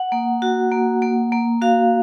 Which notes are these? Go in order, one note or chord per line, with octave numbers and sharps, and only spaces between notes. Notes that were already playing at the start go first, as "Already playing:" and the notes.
Already playing: F#5
A#3
F#4
A#3
A#3
A#3
F#4 F5